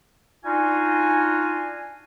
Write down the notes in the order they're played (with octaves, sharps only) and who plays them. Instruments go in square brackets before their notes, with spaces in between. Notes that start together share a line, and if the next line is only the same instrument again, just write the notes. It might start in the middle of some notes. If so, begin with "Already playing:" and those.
[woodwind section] D4 D#4 F4 F#4 F5 G#5